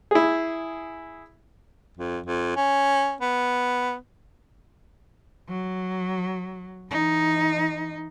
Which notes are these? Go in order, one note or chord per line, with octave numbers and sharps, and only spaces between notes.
E4 G#4
F2
F2
C#4
B3
F#3
E3 D#4